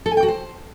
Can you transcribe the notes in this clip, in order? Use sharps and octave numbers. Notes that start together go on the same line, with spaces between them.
A4
G#5
G5
F#4
C5